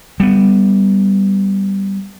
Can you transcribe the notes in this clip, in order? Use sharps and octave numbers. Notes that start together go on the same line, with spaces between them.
G3 B3